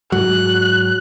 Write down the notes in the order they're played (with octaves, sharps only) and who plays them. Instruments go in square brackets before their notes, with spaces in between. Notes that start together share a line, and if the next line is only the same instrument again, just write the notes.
[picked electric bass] G#2 F#3 [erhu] F#6